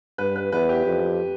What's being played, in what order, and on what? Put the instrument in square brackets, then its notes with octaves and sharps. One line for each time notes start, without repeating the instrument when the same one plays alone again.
[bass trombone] G2 [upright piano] B4
[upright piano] B4
[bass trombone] E2 [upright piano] B4
[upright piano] G4
[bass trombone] F2